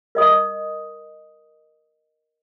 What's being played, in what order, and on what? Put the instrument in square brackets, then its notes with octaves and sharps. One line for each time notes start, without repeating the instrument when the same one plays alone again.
[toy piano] A#4 D#5 D#6